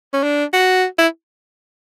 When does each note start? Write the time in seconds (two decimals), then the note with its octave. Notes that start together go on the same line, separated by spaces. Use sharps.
0.13 C#4
0.23 D4
0.53 F#4
0.99 E4